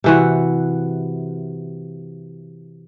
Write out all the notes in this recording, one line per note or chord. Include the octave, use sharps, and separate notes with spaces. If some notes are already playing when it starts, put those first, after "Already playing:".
C3 E3 F#4